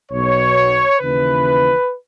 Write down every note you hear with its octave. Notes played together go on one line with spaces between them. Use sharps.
B1 B2 C#5
D#2 C#3 E3 B4